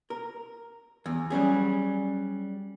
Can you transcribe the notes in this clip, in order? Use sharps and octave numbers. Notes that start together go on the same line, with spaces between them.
A#4
E2
F#3 G3 C#4 G#4